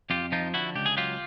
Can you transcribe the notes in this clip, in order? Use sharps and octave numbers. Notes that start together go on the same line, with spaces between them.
F2 F4 G4
F3 D#4 F4
D3 E4 F#4
C#2 G4
G#4
F#3 F4 G4